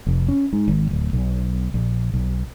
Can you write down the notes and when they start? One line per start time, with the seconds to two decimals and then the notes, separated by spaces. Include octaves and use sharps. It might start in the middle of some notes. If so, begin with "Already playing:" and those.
0.07 F1
0.28 C#4
0.53 G#2
0.68 G#1
0.91 D1
1.13 B1
1.74 A#1
2.14 B1